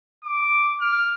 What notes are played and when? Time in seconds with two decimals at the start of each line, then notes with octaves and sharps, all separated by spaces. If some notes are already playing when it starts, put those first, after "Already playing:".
0.24 D6
0.81 F6